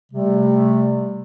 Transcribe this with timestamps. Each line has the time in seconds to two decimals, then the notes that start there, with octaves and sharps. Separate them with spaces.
0.13 C3 G3 A3